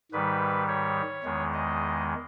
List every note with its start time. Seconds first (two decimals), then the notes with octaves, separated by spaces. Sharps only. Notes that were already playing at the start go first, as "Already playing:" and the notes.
0.12 G#2 D#3 G3 B4
0.68 C#5
1.24 E2 D#3 G#3
1.53 D#5